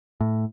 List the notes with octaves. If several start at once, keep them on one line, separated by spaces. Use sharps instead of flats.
A2